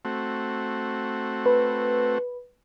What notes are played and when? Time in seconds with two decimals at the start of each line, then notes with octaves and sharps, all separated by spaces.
0.05 A3 C4 F#4
1.46 B4